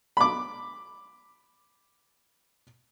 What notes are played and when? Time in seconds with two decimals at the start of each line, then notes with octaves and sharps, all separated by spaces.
0.17 B5 D6